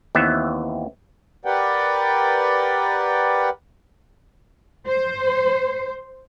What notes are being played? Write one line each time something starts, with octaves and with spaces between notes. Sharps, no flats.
D#2 E3 B3 C4 E5
G4 A#4 B4 D5 F#5 G5
C5